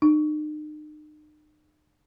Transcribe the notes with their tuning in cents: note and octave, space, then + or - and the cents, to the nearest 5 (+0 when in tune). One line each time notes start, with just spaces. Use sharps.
D#4 -40